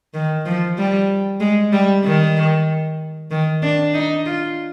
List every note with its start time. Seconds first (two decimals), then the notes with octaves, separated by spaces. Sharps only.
0.14 D#3
0.46 F3
0.78 G3
1.40 G#3
1.72 G3
2.05 D#3
3.31 D#3
3.62 D4
3.94 D#4
4.26 F4